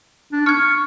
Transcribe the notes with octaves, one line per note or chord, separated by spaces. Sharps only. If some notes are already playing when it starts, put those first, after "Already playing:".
D4
C#6 F6 G#6